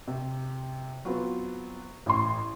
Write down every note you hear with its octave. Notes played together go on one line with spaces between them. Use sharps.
C3
F#3 B3 C4 F4
A1 C6